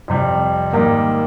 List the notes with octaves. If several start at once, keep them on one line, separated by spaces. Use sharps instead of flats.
F2 C3 G3
G#2 D#3 G3 A#3